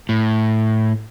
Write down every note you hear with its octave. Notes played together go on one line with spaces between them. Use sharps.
A2